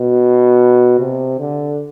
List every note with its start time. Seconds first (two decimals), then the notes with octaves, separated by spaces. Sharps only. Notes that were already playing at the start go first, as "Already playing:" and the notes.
Already playing: B2
0.99 C3
1.39 D3